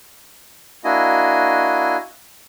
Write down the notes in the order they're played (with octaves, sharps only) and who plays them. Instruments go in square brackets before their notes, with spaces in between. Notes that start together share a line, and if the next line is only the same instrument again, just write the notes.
[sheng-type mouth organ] A#3 D4 E4 F#4 D#5 G#5